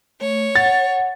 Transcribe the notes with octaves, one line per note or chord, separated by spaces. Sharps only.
A3 C#5
F#5 A6